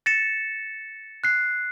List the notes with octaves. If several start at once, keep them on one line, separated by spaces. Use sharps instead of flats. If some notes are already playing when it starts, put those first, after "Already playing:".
A6 A#6 C#7 E7
F#6 C7